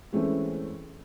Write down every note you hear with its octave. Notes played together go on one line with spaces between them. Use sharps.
E3 G#3 A3 C4 C#4